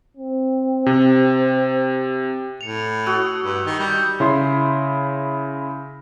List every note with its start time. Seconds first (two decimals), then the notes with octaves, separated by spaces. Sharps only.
0.17 C4
0.86 C3
2.61 A2 C#7 F7
3.07 F#4 D#6 E6
3.43 G2
3.65 D#3 G7
3.79 G3 G6 C#7 F7
4.20 C#3 E4 C6